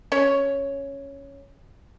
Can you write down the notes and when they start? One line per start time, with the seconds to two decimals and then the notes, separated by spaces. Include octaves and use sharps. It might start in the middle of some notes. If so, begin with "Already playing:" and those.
0.12 C#4 C#5